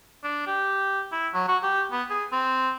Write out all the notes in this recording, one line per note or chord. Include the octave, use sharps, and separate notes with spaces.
D4
G4
E4
F#3
F#4
G4
B3
G#4
C4